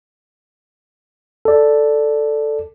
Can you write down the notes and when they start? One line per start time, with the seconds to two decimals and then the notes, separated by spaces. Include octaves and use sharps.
1.45 A4 D5